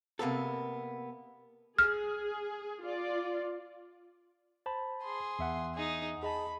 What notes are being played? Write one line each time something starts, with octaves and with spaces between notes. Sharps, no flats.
C3 A#3 B3 A4
G#4 F6
F4 D5
C5 A5 B5
G#4 C6
E2 E5 F#5
D#4 G#4
G#4 D#5 A5 B5